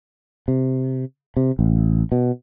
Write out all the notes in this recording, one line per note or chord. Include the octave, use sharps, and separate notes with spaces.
C3
C3
A1
B2